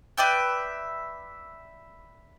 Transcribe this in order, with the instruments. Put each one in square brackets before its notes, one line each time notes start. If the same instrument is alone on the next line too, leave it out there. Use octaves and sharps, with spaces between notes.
[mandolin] B4 D5 E5 G5